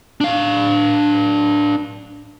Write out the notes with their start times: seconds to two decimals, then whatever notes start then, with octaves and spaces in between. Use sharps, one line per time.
0.21 D4 F5